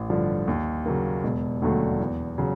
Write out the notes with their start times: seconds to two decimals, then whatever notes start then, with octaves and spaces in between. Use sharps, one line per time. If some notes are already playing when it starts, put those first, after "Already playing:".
Already playing: A1
0.10 G2 D3 F3
0.48 D#2
0.86 C#3 F#3 A#3
1.24 E1
1.62 D#2 D3 F#3 A3
2.00 E2
2.38 C#3 F#3